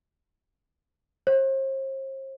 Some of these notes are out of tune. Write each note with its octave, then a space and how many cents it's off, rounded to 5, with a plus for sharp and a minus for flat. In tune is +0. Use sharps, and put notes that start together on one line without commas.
C5 +40